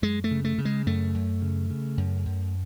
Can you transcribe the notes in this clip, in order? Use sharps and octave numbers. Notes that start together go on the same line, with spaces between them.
F#2 G#3
A3
C#3
A3
C#3
G#3
F#2 A3
F#2
C#3
C#3
F#2
F#2